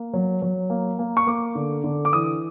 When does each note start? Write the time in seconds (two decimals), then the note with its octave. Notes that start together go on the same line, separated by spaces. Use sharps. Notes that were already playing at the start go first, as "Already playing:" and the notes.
Already playing: A#3
0.13 F#3
0.42 F#3
0.70 A#3
0.99 A#3
1.17 C#6
1.27 A#3 D6
1.55 D3
1.84 D3
2.05 D6
2.12 E3 D#6